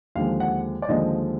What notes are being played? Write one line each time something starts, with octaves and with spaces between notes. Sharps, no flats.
D#2 D3 F3 G#3 F5
F#5
D5
D#2 D3 F3 G#3 D#5